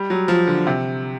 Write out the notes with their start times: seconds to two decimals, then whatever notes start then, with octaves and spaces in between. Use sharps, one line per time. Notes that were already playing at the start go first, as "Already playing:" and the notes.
Already playing: G3
0.10 F#3
0.28 F3
0.47 D3
0.67 C3